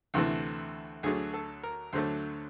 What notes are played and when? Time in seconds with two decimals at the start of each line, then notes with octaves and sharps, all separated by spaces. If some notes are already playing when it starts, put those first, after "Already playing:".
0.14 D2 C3 E3 A3
1.03 D2 D3 F#3 A3 G#4
1.34 A4
1.63 A#4
1.93 D2 D3 F#3 A3 C5